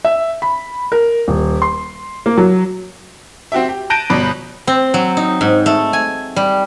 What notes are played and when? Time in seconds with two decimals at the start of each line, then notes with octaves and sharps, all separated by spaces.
0.05 E5
0.42 B5
0.92 A#4
1.28 D#1
1.62 C6
2.26 A#3
2.37 F#3
3.52 C4 F#4 G4 E5
3.69 G4
3.90 A5 F#6 G6 A#6 D7 D#7
4.10 G1 B2 D5 B5 F#6
4.67 C4
4.94 F#3
5.17 D#4
5.41 G#2
5.66 A3
5.93 G#5
6.36 G3